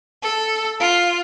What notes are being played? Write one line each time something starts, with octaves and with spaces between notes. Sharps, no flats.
A4
F4